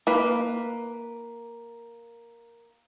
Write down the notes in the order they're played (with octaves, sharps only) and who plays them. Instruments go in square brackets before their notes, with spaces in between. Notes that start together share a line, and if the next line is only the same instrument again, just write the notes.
[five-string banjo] A#3 B4